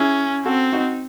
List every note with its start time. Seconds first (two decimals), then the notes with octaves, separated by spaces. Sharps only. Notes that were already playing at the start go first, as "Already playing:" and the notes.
Already playing: C#4 E4 G#4
0.45 C4 F#4 A4
0.72 D#4 F#4